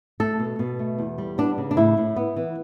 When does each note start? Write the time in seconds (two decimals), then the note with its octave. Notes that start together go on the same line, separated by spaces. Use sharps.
0.20 A3 A4
0.40 B2
0.59 B2
0.79 A3
0.98 E2
1.18 G3
1.38 B3 D4
1.58 C#3
1.71 D4
1.77 A2 E4
1.97 A2
2.16 B3
2.36 E3